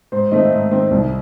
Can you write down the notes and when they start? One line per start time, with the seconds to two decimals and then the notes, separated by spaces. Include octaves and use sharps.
0.12 G#2 C5
0.31 D#3 A3 C4 D#5
0.51 G#2
0.71 D#3 A3 C4
0.91 C2